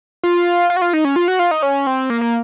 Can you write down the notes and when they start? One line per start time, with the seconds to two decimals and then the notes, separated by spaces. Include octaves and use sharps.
0.24 F4
0.70 F4
0.76 F#4
0.82 F4
0.93 D#4
1.05 C#4
1.16 F4
1.28 F#4
1.39 F4
1.51 D#4
1.63 C#4
1.87 C4
2.10 A#3
2.21 A#3